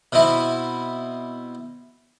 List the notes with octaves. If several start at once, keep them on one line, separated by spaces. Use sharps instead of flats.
B2 C4 E4